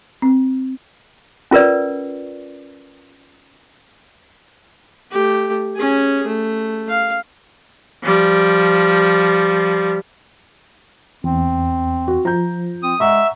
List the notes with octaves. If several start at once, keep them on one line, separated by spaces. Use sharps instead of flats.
C4
C#4 F4 A#4 B4 D5
A3 G4
C#4 G#4
A3
F5
F3 G3
E2 C4
F#4
F3 A#5 G6
C4 D#6
G#3 E5 F#5 A#5 C#6